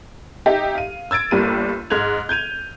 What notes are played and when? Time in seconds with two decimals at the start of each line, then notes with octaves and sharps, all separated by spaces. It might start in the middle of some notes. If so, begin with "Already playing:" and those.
0.46 D#4 G4 D#5 E5
0.75 F5 D#7
1.11 E6 G#6 A6 D7
1.31 G1 G3 A#3 D#7
1.90 G#2 F6 F#6 G#6 F7
2.29 G6 G#6 D#7 F7